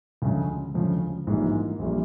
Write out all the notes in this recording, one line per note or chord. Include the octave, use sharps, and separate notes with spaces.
D2 C#3 F3 G#3
D2 C#3 F3 G#3
A#1 G#2 E3 G3 A#3
A#1 E3 G3 A#3